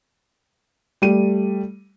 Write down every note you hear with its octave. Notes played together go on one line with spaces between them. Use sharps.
G3 A3 D#7